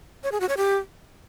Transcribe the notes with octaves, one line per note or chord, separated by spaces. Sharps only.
C#5
G#4
F#4
C#5
G4